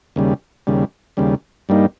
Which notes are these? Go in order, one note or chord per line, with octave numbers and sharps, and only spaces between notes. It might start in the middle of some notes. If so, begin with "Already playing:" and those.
D#2 C#3 G3
D#2 C#3 G3
D#2 C#3 G3
G2 G3 A#3 D#4